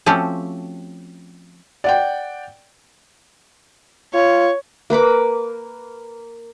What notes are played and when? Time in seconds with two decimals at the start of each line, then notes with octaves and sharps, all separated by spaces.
0.06 F3 A3 C4 C#4 F#4 G4
1.84 D5 F#5 G5
4.14 F4 C#5
4.90 A#3 B4 B5 D6